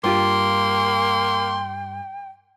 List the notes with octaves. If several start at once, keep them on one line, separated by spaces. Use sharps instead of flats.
G2 A#3 F4 G4 G5 C6